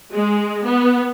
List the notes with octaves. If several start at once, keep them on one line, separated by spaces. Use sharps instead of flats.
G#3
B3